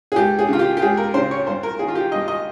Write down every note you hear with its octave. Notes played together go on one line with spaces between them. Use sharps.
G#4
C#2 G4
G#4
C#3 F4
G4
G4
C#2 G#4
A#4
C#3 C5
C#5
G2 C5
A#4
D#3 G#4
F4
G4
G2 D#5
D#5